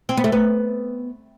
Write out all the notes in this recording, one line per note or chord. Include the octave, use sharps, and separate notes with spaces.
C4
B3
A3
B3